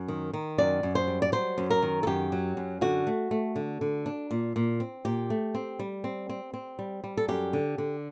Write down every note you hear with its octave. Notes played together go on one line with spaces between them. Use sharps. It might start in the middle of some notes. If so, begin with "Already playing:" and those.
Already playing: F#2
D#3
D#3
F#2 D5
F#2
C5
G3
D5
F#3 C5
F#2
A#4
D#3
A4
F#2 G4
F#3
F#2
D3 F#4
A3
A3
D3
D3
D4
A#2
A#2
C4
A#2 G4
A3
C4
G3
C4
C4
C4
G3
G3
A4
F#2 G4
D3
D3